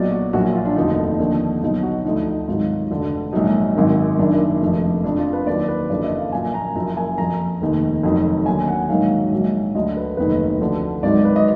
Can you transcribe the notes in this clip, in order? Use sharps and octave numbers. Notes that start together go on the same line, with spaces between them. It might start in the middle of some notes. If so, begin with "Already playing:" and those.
Already playing: B1 A#2 F#3 D5
F#4
A#1 A#2 F#3 F#4
F#4
F4
D4
F1 D#2 D3 F3 D#4
D#2 D3 F3
B1 B2 F#3 D#4
F#4
D2 D3 F3 D#4
D#4
G#1 G#2 D#3 F#3 F4
F1 F2 D3 F3
A#1 G#2 F#3 D#4
G#1 F#2 D#3
F#1 F#2 D#3 D4
F1 F2 F3
F2 F3 D4
F4
B4
D#2 D#3 F#3 D5
B4
F#1 F2 D3 F3 D5
D#5
F5
A#1 A#2 F#3 G#5
A#5
F#1 F#2 F3 A#5
G#5
F2 F3 A#5
F1 D#2 D#3
F1 F2 D#3 F#3
D#2 D3 F#3 G#5
F#5
A#1 G#2 D#3 F#3 F5
A#1 G#2 F#3
D2 D3 F#3 D#5
B4
F1 D#2 D#3 F#3 B4
D2 D3 F3
G#1 G#2 D#3 F#3 D5
B4
D#5